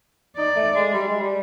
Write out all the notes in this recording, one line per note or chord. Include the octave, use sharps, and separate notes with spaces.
D#4 D5
A3
G#3
G3
G#3
G3